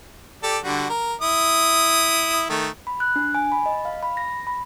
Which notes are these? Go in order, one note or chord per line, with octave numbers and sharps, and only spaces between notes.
G4 A4 D5
D3 G3 F#4
A#4
E4 D#6
D#3 A3
B5
F#6
D4
G#5
B5
D#5
F5
B5
A#6
B5